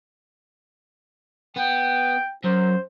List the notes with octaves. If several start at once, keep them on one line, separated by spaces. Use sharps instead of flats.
B3 G5
F#2 C5